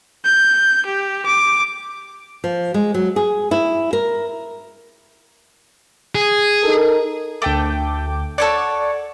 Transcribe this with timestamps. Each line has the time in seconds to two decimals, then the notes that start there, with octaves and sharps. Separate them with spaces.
0.25 G6
0.86 G4
1.26 D6
2.44 F3
2.74 G#3
2.94 F#3
3.16 G#4
3.51 E4
3.93 A#4
6.15 G#4
6.63 D#4 A4 A#4
7.42 D2 A3 G5 D6
8.38 A4 C#5 D5 F#5